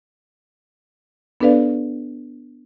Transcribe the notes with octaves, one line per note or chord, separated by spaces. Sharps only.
B3 D4 A4 B4 D5 F5